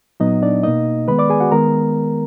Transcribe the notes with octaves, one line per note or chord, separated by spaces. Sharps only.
A#2 F#3 B3 D#4 D#5
D4 D5
B2 A#3 D#4 D#5
D#3 G#3 B3 B4 B5
D5 D6
G#4 G#5
F#4 F#5
D#3 G#3 B3 A#4 A#5